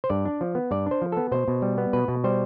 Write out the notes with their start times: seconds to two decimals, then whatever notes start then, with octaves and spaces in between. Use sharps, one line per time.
0.04 C5
0.10 G2 D5
0.25 D4
0.41 F3
0.55 B3
0.71 G2 D5
0.86 D4 C5
1.02 F3
1.12 B3 A4
1.32 B2 C5
1.48 B2
1.62 G3
1.78 B3
1.93 B2 B4
2.08 B2
2.24 G3 C5